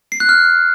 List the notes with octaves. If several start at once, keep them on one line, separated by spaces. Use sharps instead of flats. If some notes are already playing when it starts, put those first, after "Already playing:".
C7
F#6
F6